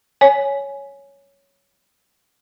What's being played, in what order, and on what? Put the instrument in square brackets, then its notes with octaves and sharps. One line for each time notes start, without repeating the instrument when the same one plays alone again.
[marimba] C#5 G#5